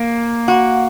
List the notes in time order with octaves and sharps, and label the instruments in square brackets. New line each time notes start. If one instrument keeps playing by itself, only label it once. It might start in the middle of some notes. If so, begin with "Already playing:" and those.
Already playing: [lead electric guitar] A#3
[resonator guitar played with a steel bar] F#4